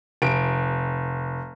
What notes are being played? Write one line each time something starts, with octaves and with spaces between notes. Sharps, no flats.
F1 D7